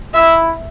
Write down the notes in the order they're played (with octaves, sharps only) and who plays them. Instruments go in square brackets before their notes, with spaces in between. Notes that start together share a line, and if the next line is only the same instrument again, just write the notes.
[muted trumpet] E4 [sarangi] E5